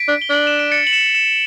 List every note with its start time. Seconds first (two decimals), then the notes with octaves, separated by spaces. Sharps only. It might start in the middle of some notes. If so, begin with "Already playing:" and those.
Already playing: B6 D7
0.08 D4
0.22 G7
0.30 D4 F#7
0.47 E7
0.59 D7
0.72 A6 C#7
0.87 F#7
0.93 C#7 E7
1.15 C#7 E7